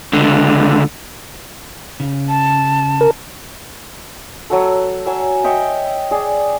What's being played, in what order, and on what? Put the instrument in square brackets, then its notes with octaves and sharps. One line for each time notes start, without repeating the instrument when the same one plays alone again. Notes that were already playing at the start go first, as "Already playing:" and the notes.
[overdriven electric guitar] C#2 D3
[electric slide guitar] C#3
[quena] A5
[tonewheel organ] A#4
[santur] F#3 F#4 A4
F#3 G#5 E6
C#5 D#5 E5 G5
G#4 D5